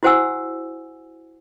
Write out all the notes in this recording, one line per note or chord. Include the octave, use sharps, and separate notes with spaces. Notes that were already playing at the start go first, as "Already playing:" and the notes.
E4 F#4 C5 F#5 G#5 E6